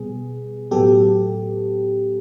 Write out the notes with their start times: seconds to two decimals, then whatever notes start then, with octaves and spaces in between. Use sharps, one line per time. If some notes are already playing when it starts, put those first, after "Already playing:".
Already playing: B2 G3 B3 G#4
0.71 A2 F#3 B3 G4 A4